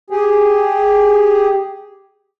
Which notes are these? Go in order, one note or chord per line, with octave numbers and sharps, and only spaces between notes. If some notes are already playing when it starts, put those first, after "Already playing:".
G4 G#4